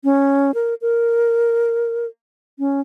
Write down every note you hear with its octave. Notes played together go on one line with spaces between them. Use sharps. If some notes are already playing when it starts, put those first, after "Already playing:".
C#4
A#4
A#4
C#4